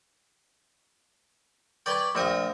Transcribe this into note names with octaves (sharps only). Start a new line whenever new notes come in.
B4 D5 G5 C#6 D6 G#6
A#1 A3 C5 F5 G5 D#6